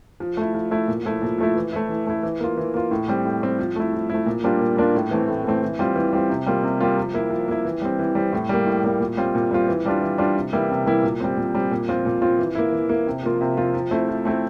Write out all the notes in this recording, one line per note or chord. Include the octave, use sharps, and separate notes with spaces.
F3
A3 E4
F3
A3 E4
A#2
F3 A3 E4
A#2
F3 A3 E4
E3
A3 E4
E3
A3 E4
E3
A#3 F4
E3
A#3 F4
A2
G3 C4
A2
G3 C4
F3
A3 E4
F3
A3 E4
A#2
G3 A#3 D4 F4
A#2
G3 A#3 D4 F4
A2
E3 A3 C4
A2
E3 A3 C4
E3
G3 C4 F4
E3
G3 C4 F4
C3
G3 A#3 F4
C3
G3 A#3 F4
F3
A#3 E4
F3
A#3 E4
E3
G3 C4
E3
G3 C4
A2
G3 A#3
A2
G3 A#3
A#2
G3 C4 F4
A#2
G3 C4 F4
E3
G3 D4 F4
E3
G3 D4 F4
C3
E3 G3 A#3 E4
C3
E3 G3 A#3 E4
A#2
G3 C4
A#2
G3 C4
A#2
F3 C4 F4
A#2
F3 C4 F4
E3
A#3 E4
E3
A#3 E4
C3
F3 A#3 F4
C3
F3 A#3 F4
F3
A3 C4 E4
F3
A3 C4 E4